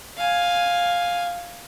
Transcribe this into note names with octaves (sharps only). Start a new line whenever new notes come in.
F5 G#5